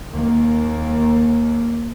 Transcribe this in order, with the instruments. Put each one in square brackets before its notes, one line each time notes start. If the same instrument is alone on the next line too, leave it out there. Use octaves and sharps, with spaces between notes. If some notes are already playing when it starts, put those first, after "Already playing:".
[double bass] D#2 A#3